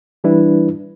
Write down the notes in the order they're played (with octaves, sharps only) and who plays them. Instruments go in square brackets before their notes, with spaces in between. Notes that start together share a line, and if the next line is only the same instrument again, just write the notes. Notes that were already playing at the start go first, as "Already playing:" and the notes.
[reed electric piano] E3 G3 D4 E4 B4